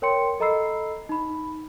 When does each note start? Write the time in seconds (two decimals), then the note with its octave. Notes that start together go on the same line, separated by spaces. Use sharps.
0.02 A#4 C#5 G5 C6 C#7
0.40 A4 D#5 A#5 B5 E6 C7
1.09 D#4 B5